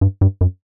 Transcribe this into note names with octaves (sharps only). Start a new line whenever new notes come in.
G2
G2
F#2